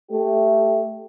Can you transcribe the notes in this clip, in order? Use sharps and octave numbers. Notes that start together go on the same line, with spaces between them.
A3 G4